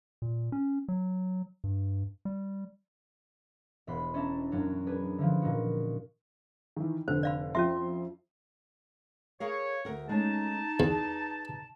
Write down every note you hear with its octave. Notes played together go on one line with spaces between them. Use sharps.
A#2
C#4
F#3
G2
G3
E1 B3 G4 B5 C6
C#4 D4 E5 A5 A#5
F#2 F#3 C#4 D4
D4 G#4 B4
D3 E3 F3
A#2 D#4 F#4
D#3 E3
F1 D3 C5
D5 F5 B5
F2 C#4 F4 E5 C6
G#4 A#4 C#5 F5
D2 A#4 F#5
G#3 A3 C#4 D#4 A5
E2 G#4 B4 D5